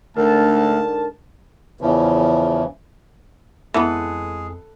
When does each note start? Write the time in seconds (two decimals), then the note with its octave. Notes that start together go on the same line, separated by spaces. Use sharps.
0.17 D2 G#2 D3 A#4 A5
1.81 E2 C#3 E3 F3
3.74 F2 E3 G#3 B3 G#4 A4 B4